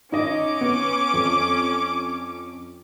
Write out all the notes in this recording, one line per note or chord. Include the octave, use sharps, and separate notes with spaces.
C#4 D#4 D#5 D6
B3
F2